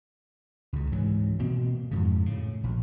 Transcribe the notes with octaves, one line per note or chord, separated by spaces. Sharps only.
C#2 C#3
G#2 E3 F#3
B2 A#3 C4
F2 G#2 C#3
A2 C#3
A#1